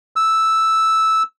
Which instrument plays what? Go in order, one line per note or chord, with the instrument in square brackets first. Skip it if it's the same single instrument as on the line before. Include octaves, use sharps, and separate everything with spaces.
[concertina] E6